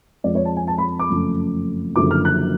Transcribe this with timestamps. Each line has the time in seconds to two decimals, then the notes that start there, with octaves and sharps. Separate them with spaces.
0.24 F2 F3 G#3 D5
0.35 C#5
0.45 A5
0.57 G#5
0.68 A5
0.78 B5
0.99 D6
1.10 F#1 F2 F3 A3 C#4
1.96 F#1 F#2 D3 F3 D6
2.11 F6
2.25 F#6